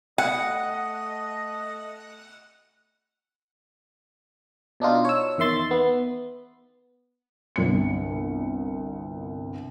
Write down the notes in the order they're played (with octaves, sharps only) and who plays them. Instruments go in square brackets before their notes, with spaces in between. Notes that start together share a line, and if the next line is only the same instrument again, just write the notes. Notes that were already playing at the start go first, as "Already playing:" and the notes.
[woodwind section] A3 D#5 [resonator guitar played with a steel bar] F#5
[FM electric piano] B2 D4 D#4 F4
C#5 E6
E2 D#3 E5 C6 A6
B3
[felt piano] G1 C2 C#7